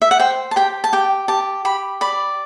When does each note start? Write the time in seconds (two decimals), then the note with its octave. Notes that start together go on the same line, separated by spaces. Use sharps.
0.02 E5
0.11 F#5
0.19 C5 G5
0.51 A5
0.56 G4 G5
0.84 A5
0.93 G4 G5
1.28 G4 A5
1.65 G4 B5
2.01 D5 B5